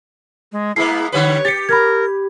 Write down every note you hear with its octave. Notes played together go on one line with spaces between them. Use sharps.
G#3
G#3 A#3 B3 E4 C7
D3 G3 B4 C#5
G4 A6 C#7
A#4 B5 G#6